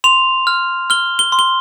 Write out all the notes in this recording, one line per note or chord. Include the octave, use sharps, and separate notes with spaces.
C6 F7
F6
F6 G7
G7
C6
G7